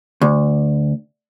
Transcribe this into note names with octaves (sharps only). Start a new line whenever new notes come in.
D2